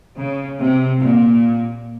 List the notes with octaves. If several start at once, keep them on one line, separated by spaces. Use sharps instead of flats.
C#3
C3
A#2